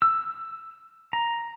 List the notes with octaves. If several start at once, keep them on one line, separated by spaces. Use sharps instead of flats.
E6
A#5